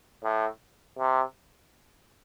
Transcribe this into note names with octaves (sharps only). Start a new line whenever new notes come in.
A2
C3